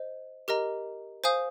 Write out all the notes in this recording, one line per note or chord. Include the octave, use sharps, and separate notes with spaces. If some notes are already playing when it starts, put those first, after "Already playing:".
Already playing: C5 D#5
G4 A#4 D#5 A#5
C5 F5 G#5 D#6 G6